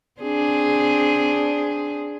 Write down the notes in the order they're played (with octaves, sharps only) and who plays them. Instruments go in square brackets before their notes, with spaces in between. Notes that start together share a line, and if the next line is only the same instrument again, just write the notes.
[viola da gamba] C4 D4 G#4